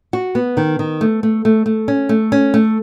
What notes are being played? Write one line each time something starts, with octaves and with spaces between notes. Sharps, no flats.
F#4
B3
D#3
D#3
A3
A3
A3
A3
C#4
A3
C#4
A3